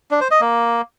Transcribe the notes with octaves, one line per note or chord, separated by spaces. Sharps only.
D4
C5
D#5
A#3